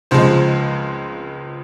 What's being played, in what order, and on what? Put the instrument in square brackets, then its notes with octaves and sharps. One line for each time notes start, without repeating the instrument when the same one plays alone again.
[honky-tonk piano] C#2 C#3 F3 G#3 C5